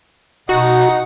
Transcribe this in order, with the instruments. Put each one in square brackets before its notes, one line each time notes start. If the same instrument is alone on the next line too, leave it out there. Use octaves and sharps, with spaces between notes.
[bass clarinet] B2 [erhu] D#4 [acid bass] F#4 [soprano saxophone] F#5